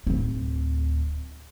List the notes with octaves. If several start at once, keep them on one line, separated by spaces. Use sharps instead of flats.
D1 C4